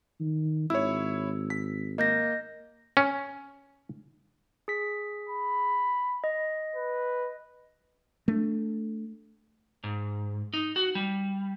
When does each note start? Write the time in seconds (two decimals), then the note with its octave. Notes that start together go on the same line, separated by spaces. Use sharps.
0.20 D#3
0.70 G#1 E4 C#5 E6
1.50 B6
1.98 A#3 D#5 G6 A#6
2.97 C#4
4.68 G#4 B6
5.29 B5
6.24 D#5
6.76 B4
8.28 A3 D4
9.84 G#2
10.53 D#4
10.76 F#4
10.95 G3